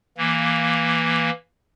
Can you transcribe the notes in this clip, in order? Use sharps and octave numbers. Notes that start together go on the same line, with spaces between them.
E3 A#3